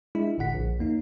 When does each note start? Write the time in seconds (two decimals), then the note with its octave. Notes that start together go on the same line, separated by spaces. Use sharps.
0.15 G#3 D4 E4
0.38 G1 A2 D3 F#5 B6
0.54 A#1
0.79 D#2 A#3 D#4